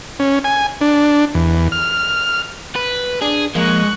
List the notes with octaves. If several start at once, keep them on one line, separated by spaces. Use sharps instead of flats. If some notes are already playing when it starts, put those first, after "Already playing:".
C#4
G#5
D4
E2
F6
B4
D4 G#4
F3 G#3 A#3 C#6 F#6